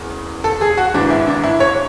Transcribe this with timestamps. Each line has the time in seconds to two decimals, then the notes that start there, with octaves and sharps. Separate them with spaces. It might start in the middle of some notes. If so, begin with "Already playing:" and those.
Already playing: E1 E2 C#3
0.44 A4
0.61 G#4
0.78 F#4
0.94 G#1 G#2 E3 D4
1.10 E4
1.27 D4
1.44 E4
1.60 C#5